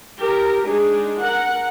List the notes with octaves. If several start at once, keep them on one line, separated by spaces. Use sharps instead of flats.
G4 A#4
G#3 D4 D#4 G#4
A#4 F#5